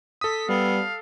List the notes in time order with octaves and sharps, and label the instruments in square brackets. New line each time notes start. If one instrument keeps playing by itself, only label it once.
[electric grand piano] A4 D#6 [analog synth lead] B6
[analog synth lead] G3 [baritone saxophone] B3 [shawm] F5